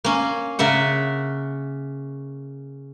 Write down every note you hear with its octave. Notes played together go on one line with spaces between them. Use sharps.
A#3 C#4
C#3 A#4 E5 F#5